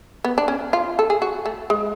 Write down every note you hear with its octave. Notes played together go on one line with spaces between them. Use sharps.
B3
D4
C#4
F4
A4
G#4
F#4
A3
G#3